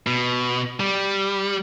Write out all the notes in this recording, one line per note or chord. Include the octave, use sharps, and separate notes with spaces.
B2
G3